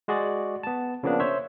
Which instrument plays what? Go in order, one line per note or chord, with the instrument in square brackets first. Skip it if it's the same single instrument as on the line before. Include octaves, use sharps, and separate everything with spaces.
[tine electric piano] G#3 F#4 G#4 D5
B3 A5
C#3 F3 A#3 B3 D4
C5 C#5 E5